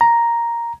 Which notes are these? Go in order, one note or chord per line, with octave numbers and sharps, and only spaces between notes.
A#5